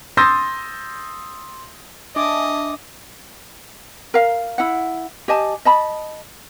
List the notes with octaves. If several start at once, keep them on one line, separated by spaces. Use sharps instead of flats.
C6 D#6 E6 G6 A6 A#6
D4 D#5 E5 G#5 A5 D6
A#4 F5
E4 F#5
G4 D#5 G#5 A5
D#5 A5 B5